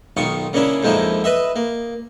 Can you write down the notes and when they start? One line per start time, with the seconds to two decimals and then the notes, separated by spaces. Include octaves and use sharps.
0.17 B1 D#3 F4 C#6
0.53 C#3 A#3 C#4 D4 E4
0.83 F2 G#2 F3 G#3 A#3 E4
1.24 B4 D#5 E5
1.56 A#3